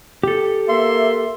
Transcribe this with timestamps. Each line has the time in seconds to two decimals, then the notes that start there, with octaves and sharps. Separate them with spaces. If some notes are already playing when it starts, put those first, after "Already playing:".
0.23 G4 A4
0.69 A#3 E5 C6